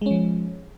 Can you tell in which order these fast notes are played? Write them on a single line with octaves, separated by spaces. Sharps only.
G#3 C#4 F3